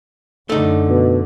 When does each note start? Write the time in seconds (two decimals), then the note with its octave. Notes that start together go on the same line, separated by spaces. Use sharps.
0.50 F#2 D3 A3 D#4
0.89 B2